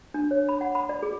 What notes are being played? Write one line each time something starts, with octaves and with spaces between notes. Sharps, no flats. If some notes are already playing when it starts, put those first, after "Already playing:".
D4
C#5
B5
F#5
B5
D5
G#4